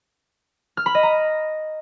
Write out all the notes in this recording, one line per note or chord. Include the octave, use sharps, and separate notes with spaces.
F6
B5
D#5
A#5